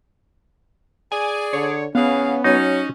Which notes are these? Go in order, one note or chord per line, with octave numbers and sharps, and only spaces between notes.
G#4 D5 G#5
D3 C#5
E3 B3 C#4 G#4 F5
F#3 C#4 D#4